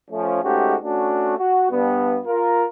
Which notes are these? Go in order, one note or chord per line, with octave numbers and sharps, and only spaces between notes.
F3 A3 C#4
G#2 G#3 A3 C#4 F#4 G4
A3 C#4 D4 F#4
F#4
G2 B3
F4 A#4